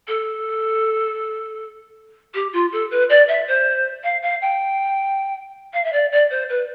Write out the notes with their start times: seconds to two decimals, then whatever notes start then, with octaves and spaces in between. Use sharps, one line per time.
0.08 A4
2.34 G4
2.53 F4
2.72 A4
2.91 B4
3.09 D5
3.28 E5
3.47 C5
4.04 F5
4.22 F5
4.41 G5
5.73 F5
5.84 E5
5.93 D5
6.12 D5
6.30 C5
6.49 B4